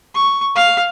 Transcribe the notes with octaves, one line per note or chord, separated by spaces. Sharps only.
C#6
F5